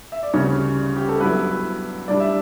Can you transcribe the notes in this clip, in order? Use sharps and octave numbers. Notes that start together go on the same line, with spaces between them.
E5
D5
D2 C#3 G3 C#4 C#5
G4
A4
G2 F#3 B3 E4 B4
A2 G3 D4 D5
E5